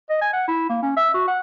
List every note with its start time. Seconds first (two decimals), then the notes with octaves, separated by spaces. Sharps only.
0.10 D#5
0.21 G#5
0.33 F#5
0.48 E4
0.69 A#3
0.82 C#4
0.97 E5
1.14 F#4
1.28 F#5